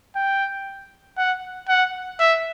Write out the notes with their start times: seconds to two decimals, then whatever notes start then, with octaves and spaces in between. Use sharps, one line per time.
0.16 G5
1.18 F#5
1.69 F#5
2.19 E5